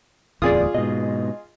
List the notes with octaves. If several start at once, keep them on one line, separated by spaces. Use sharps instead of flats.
D1 E2 A2 F4 G#4 D5 D#6
G#2 B2 D#5